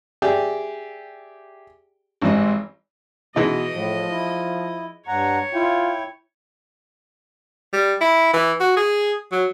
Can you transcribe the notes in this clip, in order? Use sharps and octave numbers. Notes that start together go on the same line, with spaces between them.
G4 G#4 D5 E5 G5
G#1 G#2 E3 G3 C4 D#5
B2 E3 G#3 D#4 D#5
A2 F3
E4
G2 C#5 F#5 A#5
E4 F4 G5
G3
E4
E3
F#4
G#4
F#3